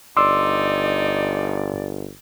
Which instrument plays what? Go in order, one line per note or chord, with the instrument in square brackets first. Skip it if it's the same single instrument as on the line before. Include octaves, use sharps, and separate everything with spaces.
[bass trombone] G1 [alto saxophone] D#4 [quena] D5 [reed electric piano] C6 D6 E6